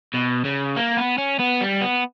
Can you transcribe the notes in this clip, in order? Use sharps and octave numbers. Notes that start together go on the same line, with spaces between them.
B2
C#3
A#3
B3
C#4
B3
G3
B3